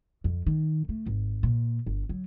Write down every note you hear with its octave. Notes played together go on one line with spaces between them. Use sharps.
F2
D#3
A3
G#1
A#2
G1
F#3